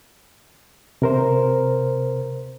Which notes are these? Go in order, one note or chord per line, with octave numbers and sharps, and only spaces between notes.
C3 A#4 C5